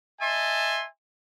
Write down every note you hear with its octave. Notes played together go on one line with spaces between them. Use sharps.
D#5 E5 G#5 A5 C6